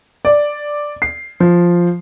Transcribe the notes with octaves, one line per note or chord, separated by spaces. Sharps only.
D5
C7
F3